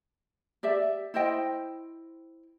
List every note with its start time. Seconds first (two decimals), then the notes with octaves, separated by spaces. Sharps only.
0.63 G4 D5 E5
1.14 E4 C5 D#5 G5